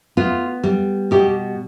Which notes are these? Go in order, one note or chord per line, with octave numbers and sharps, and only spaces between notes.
B3 F4
G3
B2 G4